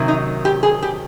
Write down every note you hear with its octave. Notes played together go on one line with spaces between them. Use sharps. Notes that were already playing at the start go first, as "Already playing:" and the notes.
Already playing: C3 D#3 F#3
D#4
G4
G#4
G4